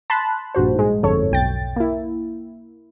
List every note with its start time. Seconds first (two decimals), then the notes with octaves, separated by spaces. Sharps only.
0.10 A5 B5 C6 F#6
0.55 A#1 G2 F#4 C5
0.75 G#2 G#3
1.03 G1 F2 G#2 A4 C#5
1.31 B1 G5 A6
1.76 A#3 E4